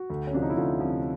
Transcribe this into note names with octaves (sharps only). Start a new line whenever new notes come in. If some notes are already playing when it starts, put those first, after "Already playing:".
Already playing: F#4
D2
C#4
C3 F3 D4
D#4
E4
D2 F4
C3 F3